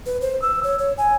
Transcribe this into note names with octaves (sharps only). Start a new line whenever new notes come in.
B4
C5
E6
C#5
C#5
G#5